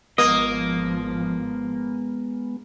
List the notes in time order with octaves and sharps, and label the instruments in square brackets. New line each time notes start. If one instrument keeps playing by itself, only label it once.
[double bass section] G#1 F3 [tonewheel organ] G#3 B3 [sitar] A#3 [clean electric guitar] D#5